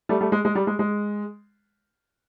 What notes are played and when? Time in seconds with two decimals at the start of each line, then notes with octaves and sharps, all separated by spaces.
0.09 G3 A3
0.21 G3 A3
0.32 G#3
0.45 G#3
0.55 G3
0.67 G#3
0.79 G#3